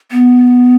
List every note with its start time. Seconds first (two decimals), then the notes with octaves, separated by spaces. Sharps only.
0.12 B3